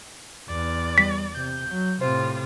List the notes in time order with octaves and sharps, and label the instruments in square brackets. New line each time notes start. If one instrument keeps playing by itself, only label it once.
[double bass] E2 [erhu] D5
[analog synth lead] G3 [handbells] B6
[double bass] C3 [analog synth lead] G6
[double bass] F#3
[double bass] A2 C3 [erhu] F4 [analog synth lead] C5